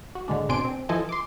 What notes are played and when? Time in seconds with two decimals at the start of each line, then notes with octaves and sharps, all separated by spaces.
0.15 F#4
0.28 A2 D3 G#3 D4
0.49 B2 C4 D4 G#5 C6 D7
0.65 C4
0.89 E3 F3 A4 D#5 G#5
1.09 C6 D6